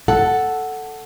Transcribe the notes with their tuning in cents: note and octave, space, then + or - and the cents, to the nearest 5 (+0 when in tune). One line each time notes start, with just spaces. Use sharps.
A4 +0 F#5 +5